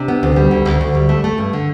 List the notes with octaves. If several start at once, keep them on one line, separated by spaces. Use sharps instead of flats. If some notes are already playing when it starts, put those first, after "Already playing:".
Already playing: C3 D4
B3
D2
G3
D2
D2
D2
G3
A3
A3
G2
D3